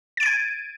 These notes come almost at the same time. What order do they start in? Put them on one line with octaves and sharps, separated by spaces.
A6 D7 D#7 G#6